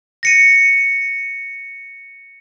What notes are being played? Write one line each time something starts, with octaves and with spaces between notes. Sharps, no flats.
A#6 C#7 D#7